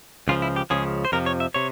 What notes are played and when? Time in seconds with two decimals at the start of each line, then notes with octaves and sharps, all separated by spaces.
0.28 C#2 C#3 F3 F4
0.42 E4
0.56 G4
0.70 C#2 C#3 F3 G#4
1.05 C5
1.12 F2 C3 F3 A#4
1.26 C#5
1.40 E5
1.54 C3 C#5